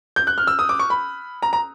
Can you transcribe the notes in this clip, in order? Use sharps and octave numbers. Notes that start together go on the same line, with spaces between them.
G6
F#6
F6
E6
D#6
D6
C#6
B5
A#5
A#5